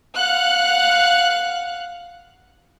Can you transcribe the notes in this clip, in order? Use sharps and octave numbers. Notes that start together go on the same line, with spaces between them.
F5 F#5 F#6